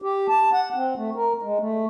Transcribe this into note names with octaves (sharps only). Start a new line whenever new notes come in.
G4
A5
F#5
C4
A3
A#4
G#3
A3